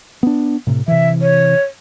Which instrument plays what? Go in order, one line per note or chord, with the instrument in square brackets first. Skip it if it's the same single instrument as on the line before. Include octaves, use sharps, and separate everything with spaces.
[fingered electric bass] B3 D4
A2 C3
[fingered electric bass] C3 E3 [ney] E5
[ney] C#5